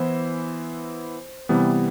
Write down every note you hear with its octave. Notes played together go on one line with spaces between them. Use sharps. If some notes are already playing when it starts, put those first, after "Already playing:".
Already playing: E3 B3 E4 C5
C3 E3 G3 B3